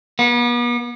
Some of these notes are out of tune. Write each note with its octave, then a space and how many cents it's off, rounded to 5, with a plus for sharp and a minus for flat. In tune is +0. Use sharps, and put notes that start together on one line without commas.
B3 -40